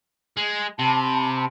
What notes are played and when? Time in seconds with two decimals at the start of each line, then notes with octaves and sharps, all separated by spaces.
0.37 G#3
0.79 C3 A5 B5